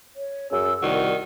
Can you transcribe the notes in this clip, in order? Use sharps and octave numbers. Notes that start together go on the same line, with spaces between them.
C#5
F#2 C#4 F#4 G#4 E6
C2 D#3 F#4 D5